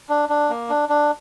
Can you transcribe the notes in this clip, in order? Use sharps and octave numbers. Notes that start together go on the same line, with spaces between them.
D4
D4
A#3
D4
D4